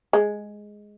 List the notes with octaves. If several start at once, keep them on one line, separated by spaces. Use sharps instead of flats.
G#3